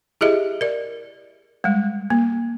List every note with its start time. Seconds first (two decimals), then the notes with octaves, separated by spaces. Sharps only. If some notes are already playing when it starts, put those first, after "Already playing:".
0.21 E4 G4 G#4 D#5 E5
0.61 A#4 D5
1.64 G3 G#3
2.10 A#3